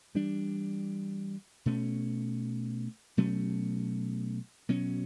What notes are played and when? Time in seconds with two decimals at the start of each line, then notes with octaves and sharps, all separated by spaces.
0.15 E3 G3 D4
1.66 B2 A3 C#4
3.17 B2 F#3 A3 C#4
4.69 B2 F#3 C#4